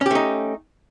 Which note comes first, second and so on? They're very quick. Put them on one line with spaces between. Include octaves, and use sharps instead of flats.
C#4 G4 A3 D#4